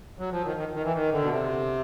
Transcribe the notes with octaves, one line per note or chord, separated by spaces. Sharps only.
F#3
F3
D#3
D#3
D#3
E3
D#3
D3
B2
C3